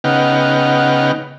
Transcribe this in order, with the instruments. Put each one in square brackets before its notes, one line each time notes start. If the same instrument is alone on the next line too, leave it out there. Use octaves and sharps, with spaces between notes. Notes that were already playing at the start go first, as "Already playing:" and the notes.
[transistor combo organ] C#3 B3 D#4 F#5 G5 F6